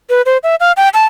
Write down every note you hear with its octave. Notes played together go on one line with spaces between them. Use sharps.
B4
C5
E5
F5
G5
A5